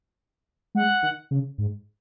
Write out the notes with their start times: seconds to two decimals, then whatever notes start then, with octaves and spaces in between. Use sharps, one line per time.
0.75 G#3 F#5
1.03 D#3
1.31 C#3
1.58 G#2